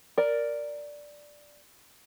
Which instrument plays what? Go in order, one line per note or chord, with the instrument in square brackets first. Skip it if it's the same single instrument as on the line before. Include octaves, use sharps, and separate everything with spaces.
[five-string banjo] A#4 D5